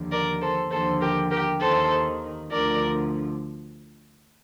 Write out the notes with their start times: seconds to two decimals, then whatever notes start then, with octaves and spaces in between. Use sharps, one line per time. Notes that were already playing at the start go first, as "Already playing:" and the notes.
Already playing: D#2 D3 F3
0.11 A#4 D5
0.41 A4 C5
0.70 D#2 D3 F3 A4 C5
1.00 G4 A#4
1.30 G4 A#4
1.60 D#2 D#3 A4 C5
2.50 D2 D3 F3 A#4 D5